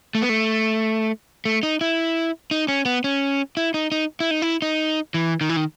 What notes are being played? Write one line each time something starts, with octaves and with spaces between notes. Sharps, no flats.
A3
B3
A3
A3
D#4
E4
D#4
C#4
B3
C#4
E4
D#4
D#4
E4
D#4
E4
D#4
E3
D#3
E3
D#3